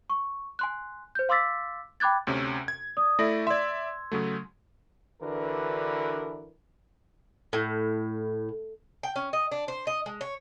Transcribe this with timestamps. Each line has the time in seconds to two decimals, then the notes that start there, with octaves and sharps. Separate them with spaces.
0.10 C#6
0.59 G#5 C6 F#6
1.15 C5 G6
1.29 F5 C6 D6 E6 A6 B6
2.00 G5 B5 D6 F#6 G#6 A6
2.27 D2 C3 C#4
2.68 G#6
2.97 D5 D#6
3.19 A3 E4 D5 E5 A#6
3.47 D5 E5 C6 E6 G#6
4.12 C#3 F#3 A3
5.22 D3 E3 D4 F#4 A#4 B4
7.53 A2
9.03 G5
9.16 C#4
9.33 D#5
9.52 D4
9.68 C5
9.87 D#5
10.06 G#3
10.21 C#5